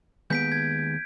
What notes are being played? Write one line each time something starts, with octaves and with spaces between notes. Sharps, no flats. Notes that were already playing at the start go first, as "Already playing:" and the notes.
D#2 G#3 B3 G6 B6 D7
G#6